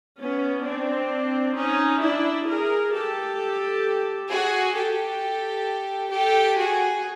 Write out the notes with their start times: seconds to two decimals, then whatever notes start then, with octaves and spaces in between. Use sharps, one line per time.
0.19 B3 C#4
0.65 C4 D4
1.57 C#4 D#4
2.02 D4 E4
2.47 G#4 A#4
2.93 G4 A4
4.29 F#4 G#4
4.75 G4 A4
6.11 G4 A4
6.57 F#4 G#4